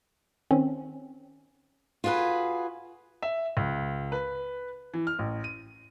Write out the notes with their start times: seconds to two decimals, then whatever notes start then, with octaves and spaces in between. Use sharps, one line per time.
0.51 D#3 C4 C#4
2.04 F4 F#4 G#4 A#4 B4
3.22 E5
3.57 C#2
4.12 B4
4.94 E3
5.07 F6
5.19 A1
5.44 D#7